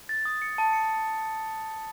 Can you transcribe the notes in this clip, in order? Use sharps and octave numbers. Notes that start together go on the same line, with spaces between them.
A6
D#6
C#7
A5
C#7